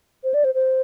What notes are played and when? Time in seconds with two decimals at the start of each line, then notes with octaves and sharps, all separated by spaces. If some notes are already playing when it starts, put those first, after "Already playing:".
0.24 C5
0.34 D5
0.44 C5
0.55 C5